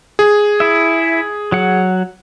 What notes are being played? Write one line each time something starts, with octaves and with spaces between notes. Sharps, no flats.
G#4
E4 E5
F#3 F#5